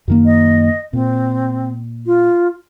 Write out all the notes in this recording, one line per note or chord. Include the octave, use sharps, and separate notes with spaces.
F#2 D#3 A#3
D#5
A#2 C4
F4